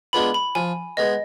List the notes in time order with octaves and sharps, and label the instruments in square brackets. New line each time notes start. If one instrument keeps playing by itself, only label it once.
[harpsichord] G#3 B3 D4 F4 [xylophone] B5
[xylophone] B5
[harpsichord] F3 [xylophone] G#5
[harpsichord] G#3 B3 [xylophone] D#5